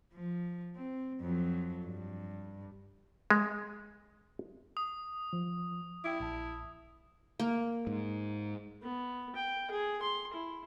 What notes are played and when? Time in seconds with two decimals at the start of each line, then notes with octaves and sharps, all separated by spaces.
0.14 F3
0.76 C4
1.21 F2 F#3
1.86 G2
3.30 G#3
4.77 D#6
5.33 F3
6.04 E4 G5 D6
6.20 A#1 A5
7.40 A#3
7.87 G#2
8.82 B3
9.35 G5
9.71 G#4
10.02 C6
10.33 E4